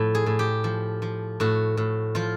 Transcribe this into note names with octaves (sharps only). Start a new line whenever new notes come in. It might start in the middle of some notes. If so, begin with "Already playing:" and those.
Already playing: A2 F3
G#4
A2
G4
F3
F3
A2 F#4
A2
F3 F4